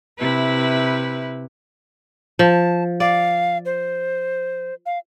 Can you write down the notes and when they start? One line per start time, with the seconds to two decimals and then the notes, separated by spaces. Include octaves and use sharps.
0.19 C3 E4 B4
2.39 F3 A5
3.00 D5 F5
3.65 C5
4.86 F5